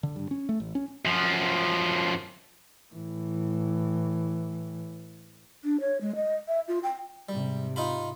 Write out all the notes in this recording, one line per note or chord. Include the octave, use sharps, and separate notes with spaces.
D3
G2
C#4
A3
A1
C#4
F#2 F3
A2 E3
D4
C#5
G#3
D#5
E5
F4
G5
G#2 C3 G3
D#4 F4 B5